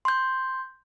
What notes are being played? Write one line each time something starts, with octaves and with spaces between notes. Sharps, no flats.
C6 G6